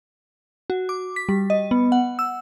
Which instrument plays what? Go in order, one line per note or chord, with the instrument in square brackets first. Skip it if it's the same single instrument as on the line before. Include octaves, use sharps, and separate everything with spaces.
[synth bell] F#4
D6
B6
G3
D#5
B3
F#5
E6